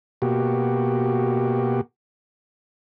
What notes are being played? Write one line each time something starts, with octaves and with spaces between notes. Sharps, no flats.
B2 A#3 F#4 G4